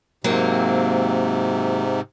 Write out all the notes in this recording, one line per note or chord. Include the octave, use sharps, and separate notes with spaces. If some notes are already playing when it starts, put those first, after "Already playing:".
G#2 C3 F#3 A#3 C4